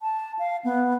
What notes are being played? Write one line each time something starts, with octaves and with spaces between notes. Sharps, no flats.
A5
F5
B3